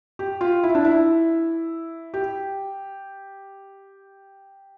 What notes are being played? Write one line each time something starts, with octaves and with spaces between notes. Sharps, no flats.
G4
F4
E4
D4
E4
G4